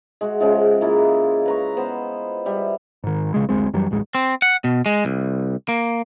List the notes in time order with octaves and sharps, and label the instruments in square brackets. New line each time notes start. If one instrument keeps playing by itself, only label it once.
[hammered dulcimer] G#3 F#4 E5
C#3 F3 G#3 F4
G#3 A#3 E4 F4
B4 A#5 C#6
B3 C5
G3 E5
[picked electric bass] G#2 D#3
A#1 C#3 G#3
F#1 D2 G#3 C4
F#2 E3 F#3 G3
D1 A1 G#3
[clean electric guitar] C4
F#5
B2
G#3
C2
A#3